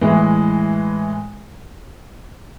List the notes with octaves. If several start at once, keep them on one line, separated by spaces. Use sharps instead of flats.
A2 E3 G#3